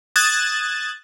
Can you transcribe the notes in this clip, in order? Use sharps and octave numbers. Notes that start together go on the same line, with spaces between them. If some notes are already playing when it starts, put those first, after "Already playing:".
D#6 F#6 G#6 A6 E7